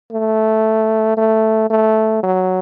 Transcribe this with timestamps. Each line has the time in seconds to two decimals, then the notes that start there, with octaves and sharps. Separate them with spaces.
0.12 A3
1.17 A3
1.70 A3
2.23 F#3